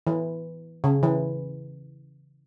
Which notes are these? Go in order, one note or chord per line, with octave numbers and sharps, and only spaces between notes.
E3
C#3
E3